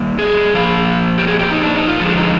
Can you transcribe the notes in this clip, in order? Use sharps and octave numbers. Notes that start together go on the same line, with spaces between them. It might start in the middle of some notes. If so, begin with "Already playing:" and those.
Already playing: D#3 G3 A#3
G#4
A#2 F3 A#3 F5
G4
G#4
G4
D#4
D4
D#4
F4
D3 F3 G#3
D#4